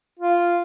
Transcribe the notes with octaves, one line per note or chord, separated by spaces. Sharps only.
F4